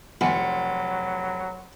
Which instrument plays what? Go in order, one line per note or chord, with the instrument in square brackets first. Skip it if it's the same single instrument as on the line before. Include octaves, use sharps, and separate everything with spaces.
[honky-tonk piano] F1 C#7 [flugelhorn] F#3 [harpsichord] B3 E4 G#4 [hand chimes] F#5 C6